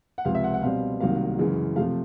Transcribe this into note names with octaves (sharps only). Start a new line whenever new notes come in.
F#5
C#2 C3 F3 F5
E5
F#5
F#5
B2 G3 C4 F5
C2 C3 D#3 F#3 A#3 F5
F#2 C#3 E3 G#3
C3 F3 A3 F5